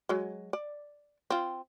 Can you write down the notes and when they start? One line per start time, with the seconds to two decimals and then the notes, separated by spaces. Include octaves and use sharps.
0.09 F#3 G#3
0.53 D5
1.30 C4 F4